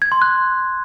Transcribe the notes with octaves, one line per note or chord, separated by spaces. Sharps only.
G#6
C6
F#6